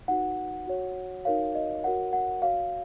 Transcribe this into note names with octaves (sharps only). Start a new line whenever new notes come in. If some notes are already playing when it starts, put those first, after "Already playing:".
D#4 F#4 B4 F#5
F#4 C#5
D#4 F#4 A#4 C#5 F5
D#5
F#4 A#4 C#5 F#5
F#5
F#4 C#5 F5